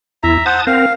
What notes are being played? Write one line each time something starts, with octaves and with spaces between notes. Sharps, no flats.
E2 E4 E5 A#5
C5 F#5 A5 D#6
C4 A#4 F5